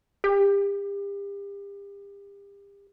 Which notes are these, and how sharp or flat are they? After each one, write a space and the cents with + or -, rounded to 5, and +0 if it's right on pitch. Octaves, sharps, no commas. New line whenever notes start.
G4 +35